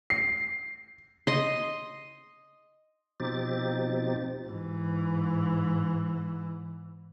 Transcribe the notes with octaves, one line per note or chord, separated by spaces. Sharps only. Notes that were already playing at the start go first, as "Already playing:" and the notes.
C7
D#5 C6
B2 F3 C4 D#4 G4 A6
G#2 E3